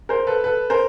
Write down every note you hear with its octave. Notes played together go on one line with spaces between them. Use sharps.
A#4 C5
A4 B4
A4 B4
A#4 C5